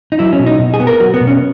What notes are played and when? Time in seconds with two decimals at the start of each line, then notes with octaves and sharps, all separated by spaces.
0.12 D#4
0.19 F#3 E4
0.33 C#4
0.39 B2
0.46 D#4
0.59 B2
0.74 G#4
0.80 B3
0.87 A#4
1.00 F#3 F#4
1.14 B3
1.20 B2
1.27 C#4